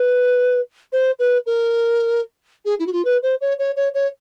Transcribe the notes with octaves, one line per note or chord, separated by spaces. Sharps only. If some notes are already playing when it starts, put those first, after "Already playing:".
Already playing: B4
C5
B4
A#4
G#4
E4
F#4
F4
B4
C5
C#5
C#5
C#5
C#5